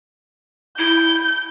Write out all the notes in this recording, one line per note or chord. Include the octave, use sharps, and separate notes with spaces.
E4 G6